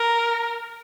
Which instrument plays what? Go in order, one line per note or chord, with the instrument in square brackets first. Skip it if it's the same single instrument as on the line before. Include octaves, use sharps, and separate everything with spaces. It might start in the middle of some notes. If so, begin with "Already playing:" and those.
Already playing: [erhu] A#4